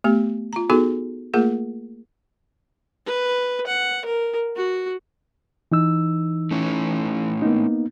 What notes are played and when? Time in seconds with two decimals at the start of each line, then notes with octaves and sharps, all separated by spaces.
0.04 A3 B3 G4
0.53 F4 A#5
0.70 B3 D#4 F#4 G#4 A4
1.34 A3 A#3 F4 G#4 A#4
3.06 B4
3.67 F#5
4.05 A#4
4.56 F#4
5.72 E3 D#4 E6
6.51 A3 C#4 E4
7.42 A#3 B3 D#4